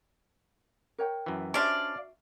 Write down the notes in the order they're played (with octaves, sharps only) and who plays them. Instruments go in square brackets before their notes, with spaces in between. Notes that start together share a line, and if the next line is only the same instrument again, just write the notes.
[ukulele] A#4 C#5 G5
[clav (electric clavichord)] F#2 E3
[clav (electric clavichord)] C#4 D4 C5 [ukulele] F#4 E5 [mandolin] D5 F5